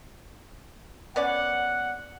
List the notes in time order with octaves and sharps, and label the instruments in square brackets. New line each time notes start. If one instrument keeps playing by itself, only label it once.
[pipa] B3 C#4 D5 [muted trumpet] F#5